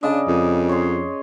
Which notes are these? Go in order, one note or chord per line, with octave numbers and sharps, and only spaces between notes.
C#3 D4 D5 D#5
F2
C#5 C6